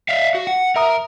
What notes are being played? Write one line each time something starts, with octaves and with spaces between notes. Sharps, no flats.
D5 E5 F5
F#4
F#5
A#4 E5 A#5 D#6